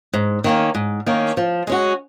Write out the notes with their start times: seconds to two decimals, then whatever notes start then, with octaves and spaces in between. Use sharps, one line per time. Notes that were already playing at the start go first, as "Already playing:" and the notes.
0.14 G#2
0.44 D#3 A#3 C#4
0.75 G#2
1.06 D#3 A#3 C#4
1.37 F3
1.67 G#3 C#4 F#4